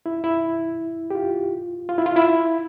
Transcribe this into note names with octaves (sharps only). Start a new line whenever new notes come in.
E4
E4
G4
F4
F4
E4
F4
E4